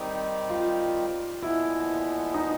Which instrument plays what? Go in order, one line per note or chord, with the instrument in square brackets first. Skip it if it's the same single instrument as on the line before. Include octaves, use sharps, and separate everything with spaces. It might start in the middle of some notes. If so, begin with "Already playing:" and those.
Already playing: [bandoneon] D#3 G3 C4 D#4 G4
[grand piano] F4
[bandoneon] A#2 F3 G#3 B3 [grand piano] E4
[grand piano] D#4